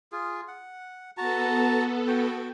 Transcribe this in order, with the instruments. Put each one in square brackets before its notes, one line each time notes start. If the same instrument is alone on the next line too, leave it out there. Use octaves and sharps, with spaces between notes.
[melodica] F4 G#4
F#5
[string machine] B3 A4 [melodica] F#4 A5 A#5
[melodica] F#4 G5